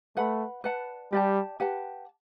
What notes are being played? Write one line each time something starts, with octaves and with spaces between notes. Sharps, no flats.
A3 B4 F#5 B5
B4 D5 F#5 A5
G3 G4 D5 A5
G4 B4 F#5 A5